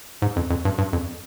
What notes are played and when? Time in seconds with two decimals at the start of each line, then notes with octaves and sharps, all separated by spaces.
0.22 G#2
0.36 F2
0.50 F2
0.65 G2
0.78 G2
0.93 F2